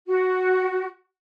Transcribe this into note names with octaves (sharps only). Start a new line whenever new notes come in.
F#4